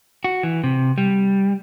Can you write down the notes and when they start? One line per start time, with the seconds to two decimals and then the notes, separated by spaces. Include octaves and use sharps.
0.24 F#4
0.43 E3
0.64 C3
0.98 G3